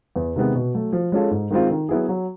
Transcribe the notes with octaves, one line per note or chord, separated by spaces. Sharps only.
E2
C3 D#3 G#3 B3
B2
F#3 A3
F3
G#3 C#4 F4 A4
G#2
D#3 G#3 C4 F4
D#3
F#3 B3 E4 G#4
F#3